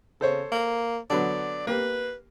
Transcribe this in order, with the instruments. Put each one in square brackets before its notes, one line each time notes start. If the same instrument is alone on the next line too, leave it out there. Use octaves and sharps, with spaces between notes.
[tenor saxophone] C#3 [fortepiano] A4 C5 C#5
[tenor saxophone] A#3
[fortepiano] D3 F#3 B3 [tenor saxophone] D5
[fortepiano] A#3 G4 [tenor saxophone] B4